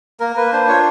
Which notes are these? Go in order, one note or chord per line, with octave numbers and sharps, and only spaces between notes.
A#3 A#4
A#3 B4
D4 C5
F4 C#5